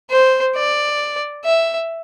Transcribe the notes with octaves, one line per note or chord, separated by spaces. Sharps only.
C5
D5
E5